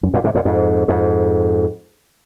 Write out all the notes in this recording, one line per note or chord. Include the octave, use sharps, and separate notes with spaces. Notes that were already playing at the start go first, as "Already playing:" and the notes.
F#2
F#2 A#2
G#2 C3
F#2 A#2
F2 G#2
F2 G#2